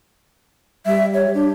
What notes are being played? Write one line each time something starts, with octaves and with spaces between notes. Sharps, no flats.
G3 E5
C#5
D4 G4